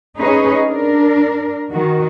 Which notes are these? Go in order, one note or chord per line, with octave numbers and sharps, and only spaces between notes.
C#4 D#4 G#4 B4 C#5 D#5
D4 A#4
D#3 F#4